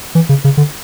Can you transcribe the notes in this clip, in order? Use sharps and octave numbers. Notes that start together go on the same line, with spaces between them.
E3
C#3
C#3
D3